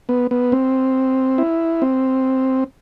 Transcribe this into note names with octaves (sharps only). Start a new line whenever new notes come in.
B3
B3
C4
E4
C4